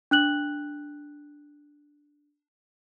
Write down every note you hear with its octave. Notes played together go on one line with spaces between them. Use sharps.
D4 F#6 F#7